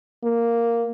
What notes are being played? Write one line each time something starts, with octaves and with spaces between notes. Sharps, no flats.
A#3